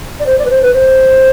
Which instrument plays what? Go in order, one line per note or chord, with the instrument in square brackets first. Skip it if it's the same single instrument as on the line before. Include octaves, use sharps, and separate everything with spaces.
[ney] D5
C5
D5
B4
C5
B4
C5